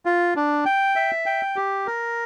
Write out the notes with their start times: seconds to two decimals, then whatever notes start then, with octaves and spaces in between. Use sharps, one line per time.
0.06 F4
0.36 D4
0.65 G5
0.96 E5
1.26 G5
1.56 G4
1.87 A#4